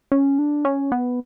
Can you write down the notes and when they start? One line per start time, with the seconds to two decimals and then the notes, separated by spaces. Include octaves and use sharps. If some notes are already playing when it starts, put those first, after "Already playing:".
0.12 C#4
0.39 D4
0.65 C#4
0.92 B3